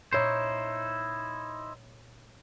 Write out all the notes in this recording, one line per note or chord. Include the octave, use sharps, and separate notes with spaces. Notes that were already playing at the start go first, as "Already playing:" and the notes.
A#2 D#4 E4 C5 C#5